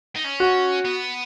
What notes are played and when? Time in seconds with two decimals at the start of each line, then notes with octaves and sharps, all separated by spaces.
0.16 D#4
0.24 C#4
0.40 F#4
0.85 B3